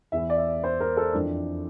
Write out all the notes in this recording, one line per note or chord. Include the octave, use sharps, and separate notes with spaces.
E2 E3 E5
D5
E5
C5
A#4
A4
F2 E3 D4